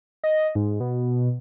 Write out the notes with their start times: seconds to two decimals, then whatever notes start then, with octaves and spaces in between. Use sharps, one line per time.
0.24 D#5
0.55 G#2
0.80 B2